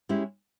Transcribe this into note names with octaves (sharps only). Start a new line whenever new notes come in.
G#3 C#4 E4 G4